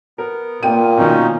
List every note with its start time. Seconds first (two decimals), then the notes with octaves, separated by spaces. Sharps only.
0.18 B3 A#4
0.63 A#2 A#3 G5 D#7
0.97 B2 D#3 C#4 D#4